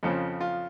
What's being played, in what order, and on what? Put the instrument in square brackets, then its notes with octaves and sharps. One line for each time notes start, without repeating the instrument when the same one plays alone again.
[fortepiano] F2 C#3 F3
F4